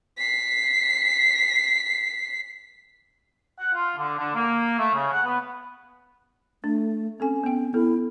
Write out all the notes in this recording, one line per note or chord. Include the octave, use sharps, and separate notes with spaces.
B6 C7
F#5
F4
D3
D3
A#3
A3
C#3
F#5
B3
A3 D4
C4 C#4 A4 G#5
B3 G5
B3 E4 A4